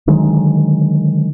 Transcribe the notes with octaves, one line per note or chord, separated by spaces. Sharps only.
D3 D#3 F#3 G#3